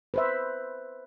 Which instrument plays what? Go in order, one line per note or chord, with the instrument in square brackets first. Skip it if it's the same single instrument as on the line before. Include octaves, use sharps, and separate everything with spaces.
[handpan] B4 C5 E5